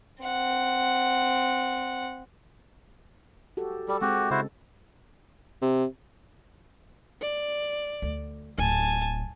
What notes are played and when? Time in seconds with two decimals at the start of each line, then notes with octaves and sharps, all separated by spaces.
0.23 C4 F#5
3.57 F#4 G4 A4
3.89 G3 A4
4.01 G#3 C4 F#4 G4
4.31 C#3 E4 F#4 C5
5.62 C3
7.22 D5
8.02 D2
8.58 D1 G#5 A5